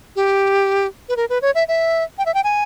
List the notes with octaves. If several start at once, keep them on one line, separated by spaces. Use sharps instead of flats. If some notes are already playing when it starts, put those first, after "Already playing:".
G4
B4
A#4
B4
C#5
E5
E5
G5
E5
G5
G#5